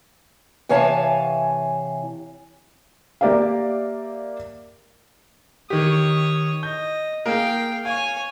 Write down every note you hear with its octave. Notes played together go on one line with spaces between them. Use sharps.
C3 E3 C#5 F5 G#5 A5
A#3 G4 A#4 D5 E5 F5
D#3 G4 C#5 D#6
D#5 G6
A#3 G#4 A#4 F5 G5
C#5 F5 G#5